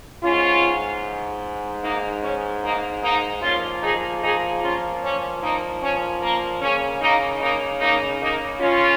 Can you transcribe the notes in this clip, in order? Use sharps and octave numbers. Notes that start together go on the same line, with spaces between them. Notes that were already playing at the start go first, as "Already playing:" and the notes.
G#2 G#3 C#4 F4
A#3 D#4
C#4
A#3 D#4
A#3 D#4
A#2 F3 A#3 C#4 F4
D#4 G#4
D#4 G#4
C#4 F4
C#4
A#3 D#4
C#4
A#3
C#3 A#3 C#4
A#3 D#4
A#3 D#4
A#3 D#4
A#3 D#4
C#4 F4